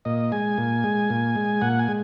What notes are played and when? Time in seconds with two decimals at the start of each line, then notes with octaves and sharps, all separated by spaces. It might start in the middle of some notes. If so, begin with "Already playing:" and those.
0.05 A#2 D#5
0.32 G#3 G#5
0.58 A#2
0.84 G#3
1.10 A#2
1.36 G#3
1.61 A#2 F#5
1.79 G#5
1.88 G#3